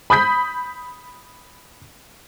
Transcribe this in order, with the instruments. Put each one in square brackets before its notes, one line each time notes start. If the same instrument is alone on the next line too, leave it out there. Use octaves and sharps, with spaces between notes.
[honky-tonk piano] B5 D#6 G6 B6